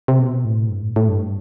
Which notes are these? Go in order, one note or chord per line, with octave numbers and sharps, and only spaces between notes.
C3
B2
A2
G2
A2
A2
G2